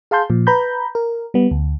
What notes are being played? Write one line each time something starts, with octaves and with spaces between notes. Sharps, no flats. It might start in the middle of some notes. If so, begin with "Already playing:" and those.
G#4 F5 A5 C6 G6
A#2 F3
B4 A#5 B5 G6
A#4
G3 B3
D2